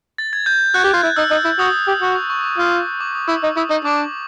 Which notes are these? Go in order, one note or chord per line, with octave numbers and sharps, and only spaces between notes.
A6
G#6
G6
F#4 F#6
G4
F4
E4
D#4 E6
D#4
E4
F#4 D#6
G4
F#4
C#6
C#6
D6
F4
D#6
D6
D#6
E4 E6
D#4
E4 D#6
D#4
D4 D6